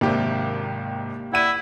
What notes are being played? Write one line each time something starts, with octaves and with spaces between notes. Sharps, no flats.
G#1 C3 D#3 A#3 D4 G4
E4 D5 F#5 G#6 B6 D#7